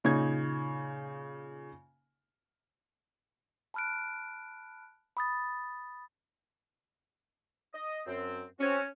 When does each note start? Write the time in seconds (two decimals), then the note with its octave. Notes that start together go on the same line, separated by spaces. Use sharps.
0.04 A#2 C#3 D#4 G#6
3.74 A5 B5 F6 F#6 D7
5.17 B5 D#6 A6
7.74 D#5
8.07 F#2 C4
8.60 C4 C#4 F#4